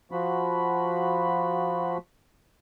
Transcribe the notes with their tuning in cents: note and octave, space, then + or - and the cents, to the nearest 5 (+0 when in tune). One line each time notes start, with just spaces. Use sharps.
F3 +0 F#4 +0 B5 +0